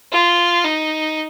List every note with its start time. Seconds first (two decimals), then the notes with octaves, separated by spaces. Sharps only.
0.12 F4
0.64 D#4